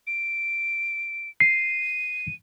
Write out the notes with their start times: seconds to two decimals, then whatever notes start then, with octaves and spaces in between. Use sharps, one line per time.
0.07 D7
1.40 C7 D#7